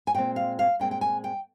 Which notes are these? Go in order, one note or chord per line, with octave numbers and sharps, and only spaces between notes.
G#5
A#2 G#3 C4 G5
F5
F5
A#2 G#3 C4 G5
G5
G#5
G5